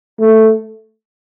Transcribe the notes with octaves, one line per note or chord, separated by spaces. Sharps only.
A3